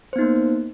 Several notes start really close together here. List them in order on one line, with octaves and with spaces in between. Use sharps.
C5 B3 D#4 A#3